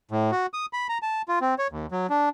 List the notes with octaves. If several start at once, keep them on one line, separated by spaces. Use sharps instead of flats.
A2
F#4
D#6
B5
A#5
A5
F4
C4
C#5
D#2
F#3
D4